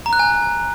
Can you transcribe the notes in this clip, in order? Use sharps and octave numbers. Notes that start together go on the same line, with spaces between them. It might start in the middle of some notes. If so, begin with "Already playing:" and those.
A#5
F#6
G#5